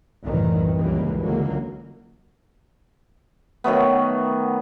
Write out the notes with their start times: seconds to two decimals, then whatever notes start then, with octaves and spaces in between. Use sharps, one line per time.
0.25 C2 F#2 A2 D#3 E3
0.76 C#2 D#3 E3 G3 G#3 A#3
1.21 C#2 D3 F#3 G#3 A#3
3.64 D#3 F#3 A3 B3